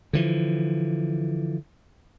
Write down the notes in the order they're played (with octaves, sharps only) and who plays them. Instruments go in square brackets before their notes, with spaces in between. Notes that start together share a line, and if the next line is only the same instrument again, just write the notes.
[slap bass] D3 E3 F3